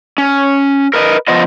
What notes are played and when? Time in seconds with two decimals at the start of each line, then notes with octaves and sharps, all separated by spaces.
0.18 C#4
0.93 A#4 B4 D#5
1.28 F3 B3 F4 D#5